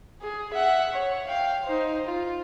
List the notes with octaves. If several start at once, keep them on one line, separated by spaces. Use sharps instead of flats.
G#4
E5 F#5
C#5
F5 G5
D#4 C5
F4